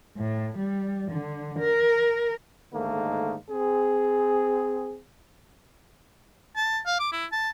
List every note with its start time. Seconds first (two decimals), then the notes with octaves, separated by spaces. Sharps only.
0.17 A2
0.58 G3
1.12 D3
1.59 A#4
2.73 G#2 D3 D#3 A3 A#3
3.50 C4 G#4
6.56 A5
6.86 F5
7.00 D6
7.12 E4
7.32 A5